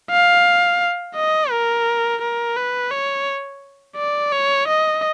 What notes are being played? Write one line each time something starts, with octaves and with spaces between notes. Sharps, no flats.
F5
D#5
A#4
A#4
B4
C#5
D5
C#5
D#5